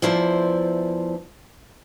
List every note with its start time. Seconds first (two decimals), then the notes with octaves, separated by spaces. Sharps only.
0.02 E2 F3 E4 C5 D5